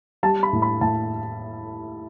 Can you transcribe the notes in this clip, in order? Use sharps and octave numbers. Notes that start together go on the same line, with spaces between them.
G3 A5
B5
A2
B5
A2 A5